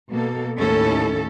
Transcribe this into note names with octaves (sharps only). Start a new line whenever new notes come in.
B2 A#3 A4
D#2 A2 C#4 A4